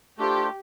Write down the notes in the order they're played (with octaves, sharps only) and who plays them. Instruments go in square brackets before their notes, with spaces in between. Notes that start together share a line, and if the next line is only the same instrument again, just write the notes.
[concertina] A3 D4 F4 A4 C5 [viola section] G4